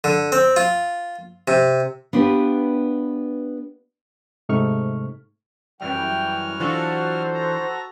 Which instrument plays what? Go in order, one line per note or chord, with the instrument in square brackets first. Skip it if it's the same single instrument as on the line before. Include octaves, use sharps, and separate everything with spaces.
[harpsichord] D3
C4
F4
C3
[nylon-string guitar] B3 D4 F4 G4 B4
[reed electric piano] G#2 C3 A3 D#4 C#6 F6
[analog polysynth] F#2 E3 G3 [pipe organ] F#3 F6 [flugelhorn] G5
[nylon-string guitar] E3 D4 F4 [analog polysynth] F#4 A4 [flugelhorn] C5
[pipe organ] A#5